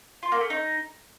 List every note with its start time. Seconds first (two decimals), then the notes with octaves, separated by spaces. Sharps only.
0.23 F4
0.32 A#3
0.41 A3
0.50 D#4